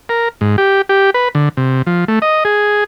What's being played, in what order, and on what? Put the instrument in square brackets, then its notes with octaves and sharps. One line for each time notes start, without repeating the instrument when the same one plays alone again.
[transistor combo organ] A#4
G#2
G4
G4
B4
D3
C3
F3
A3
D#5
G#4